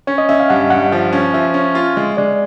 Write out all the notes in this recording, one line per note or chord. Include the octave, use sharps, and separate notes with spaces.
C#4 C#5
D#5
C#4 E5
F5
G2 F#5
G2 F#5
F3
C#4
F3 E5
C#4
F4
G#3
G#3 D5